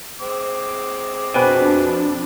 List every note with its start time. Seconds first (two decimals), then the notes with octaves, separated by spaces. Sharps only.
0.20 G#3 C4 D6
1.34 F2 B2 D4 F#4 B4 C5 G5 G#5